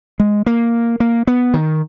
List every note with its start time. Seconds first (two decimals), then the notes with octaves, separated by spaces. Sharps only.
0.20 G#3
0.46 A#3
1.00 A#3
1.27 B3
1.54 D#3